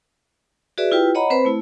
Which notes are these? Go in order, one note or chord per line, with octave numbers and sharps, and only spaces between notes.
F#4 G#4 B4 D5 E5
E4 F4 G4 B4 G5
C#5 D#5 F#5 A#5 B5
C4 B4 C5 B5
A3 E4